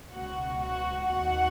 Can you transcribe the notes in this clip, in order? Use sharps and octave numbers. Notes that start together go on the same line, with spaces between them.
C#2 B2 F#4 F#5
F#4 F#5
D#2 D#3 F#4 F#5